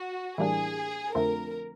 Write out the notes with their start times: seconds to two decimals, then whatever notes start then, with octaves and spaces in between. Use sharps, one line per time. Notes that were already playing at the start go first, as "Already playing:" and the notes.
Already playing: F#4
0.38 A2 E3 G3 A#3 D4 G#4
1.15 F2 D3 F3 A3 C4 A#4